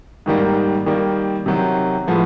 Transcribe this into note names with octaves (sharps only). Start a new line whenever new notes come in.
G#2 D#3 G3 A#3
D#3 G3 A#3
C3 D#3 F#3
A2 F3 G#3 B3